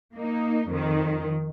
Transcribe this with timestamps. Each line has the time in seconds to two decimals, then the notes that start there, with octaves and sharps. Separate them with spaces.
0.15 A#3 D#4
0.68 F2 D#3